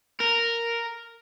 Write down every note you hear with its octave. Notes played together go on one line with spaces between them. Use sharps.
A#4